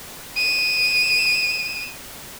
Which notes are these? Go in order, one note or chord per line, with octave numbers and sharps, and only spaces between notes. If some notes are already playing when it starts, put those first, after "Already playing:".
D#7 E7